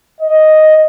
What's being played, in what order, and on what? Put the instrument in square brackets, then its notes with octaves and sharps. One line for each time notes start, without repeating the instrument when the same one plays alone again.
[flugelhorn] D#5